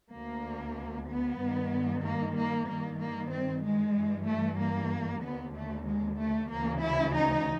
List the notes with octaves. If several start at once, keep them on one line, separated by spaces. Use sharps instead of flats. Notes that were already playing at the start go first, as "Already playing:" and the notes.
D2 D3 A#3
B3
G2 D#3
A#3
A#3
G2 D#3 A#3
A#3
C4
G#3
G2 E3
A3
A#3
D#2 D3 B3
A3
G#3
A3
D2 C#3 E3 A#3
E4
D#4